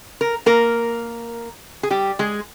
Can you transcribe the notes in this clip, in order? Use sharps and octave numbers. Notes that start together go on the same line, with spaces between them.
A#4
A#3 A#4
G#4
G3 G4
G#3 G#4